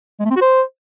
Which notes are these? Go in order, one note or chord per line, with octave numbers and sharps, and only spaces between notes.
G#3
A3
C4
F#4
C5